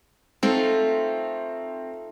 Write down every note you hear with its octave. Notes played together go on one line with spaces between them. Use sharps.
A3 C4 D#4 F4